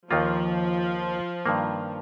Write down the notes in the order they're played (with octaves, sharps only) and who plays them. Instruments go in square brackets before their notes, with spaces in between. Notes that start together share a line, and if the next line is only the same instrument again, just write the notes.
[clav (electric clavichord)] D#2 D#3 A#3 F4 [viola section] F3
[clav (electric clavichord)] G2 D#3 A#3